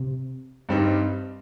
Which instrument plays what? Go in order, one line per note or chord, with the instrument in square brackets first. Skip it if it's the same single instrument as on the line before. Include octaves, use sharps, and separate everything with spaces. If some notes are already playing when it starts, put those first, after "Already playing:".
Already playing: [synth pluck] C3
[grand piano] G2 G3 C4 D#4